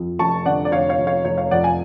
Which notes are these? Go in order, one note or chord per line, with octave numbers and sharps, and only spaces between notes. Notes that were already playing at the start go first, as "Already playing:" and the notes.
Already playing: F2
F1 A5 C#6
D3 D5 F#5
D5
F1 C#5 F5
C#5 F5
F1
C#5 F5
F1 C#5
C#5 F5
F2 D5 F#5
F5 G#5